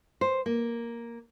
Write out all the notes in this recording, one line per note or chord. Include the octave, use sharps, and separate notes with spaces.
C5
A#3